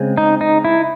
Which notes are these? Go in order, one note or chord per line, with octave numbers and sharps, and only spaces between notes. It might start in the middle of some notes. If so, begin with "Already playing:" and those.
Already playing: C#3 G#3 C4
D#4
D#4
E4